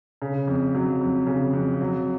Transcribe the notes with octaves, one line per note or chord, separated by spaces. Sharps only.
C#3
F2
F#3
F2
C#3
F2
F#3